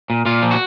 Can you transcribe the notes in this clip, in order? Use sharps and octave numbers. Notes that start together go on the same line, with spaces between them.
A#2
A#2 F4
F3
F#4